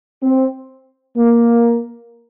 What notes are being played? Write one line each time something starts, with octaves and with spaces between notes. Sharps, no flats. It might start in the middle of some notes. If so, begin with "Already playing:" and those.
C4
A#3